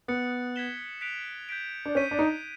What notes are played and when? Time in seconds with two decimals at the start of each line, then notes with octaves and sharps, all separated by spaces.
0.08 B3 D#6 F#6 A6 C#7
0.56 G#6 B6 E7 G7
1.01 F#6 B6 D7 F7
1.49 G6 B6 D7
1.86 D4
1.95 C#4 G6 B6 D#7
2.11 D4
2.19 D#4